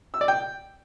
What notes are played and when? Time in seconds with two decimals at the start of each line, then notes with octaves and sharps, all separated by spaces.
0.14 E6
0.21 D5
0.28 G5